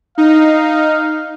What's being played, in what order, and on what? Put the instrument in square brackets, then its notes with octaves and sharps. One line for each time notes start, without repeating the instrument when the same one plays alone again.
[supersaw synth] D#4 [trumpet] F5